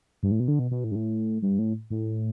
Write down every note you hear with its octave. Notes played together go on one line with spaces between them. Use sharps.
G2
A2
B2
D3
B2
B2
A2
G2
A2
G2
A2
A2